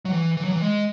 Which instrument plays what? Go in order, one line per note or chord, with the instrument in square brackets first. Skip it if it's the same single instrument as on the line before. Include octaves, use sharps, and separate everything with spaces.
[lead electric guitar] F#3
E3
E3
F#3
E3
G#3